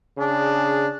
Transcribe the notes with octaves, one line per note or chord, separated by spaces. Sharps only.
C#3 D4 G#4